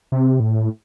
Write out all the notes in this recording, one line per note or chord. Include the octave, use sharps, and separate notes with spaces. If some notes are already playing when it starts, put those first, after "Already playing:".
C3
A2